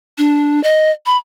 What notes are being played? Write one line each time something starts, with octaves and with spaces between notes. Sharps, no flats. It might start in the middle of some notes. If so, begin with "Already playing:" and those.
D4
D#5
B5